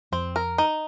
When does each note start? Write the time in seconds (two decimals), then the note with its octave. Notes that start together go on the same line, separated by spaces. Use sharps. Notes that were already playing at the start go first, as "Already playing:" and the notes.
0.12 F2 C4
0.36 A#4
0.58 D#4